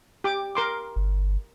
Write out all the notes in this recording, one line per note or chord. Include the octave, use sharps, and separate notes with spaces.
G4 D6
A#4 C6 D6
G1